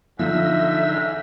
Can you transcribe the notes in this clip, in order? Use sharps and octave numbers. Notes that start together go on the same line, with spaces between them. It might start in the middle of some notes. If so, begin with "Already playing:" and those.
G#2 D3 F3 D#4 E5 E6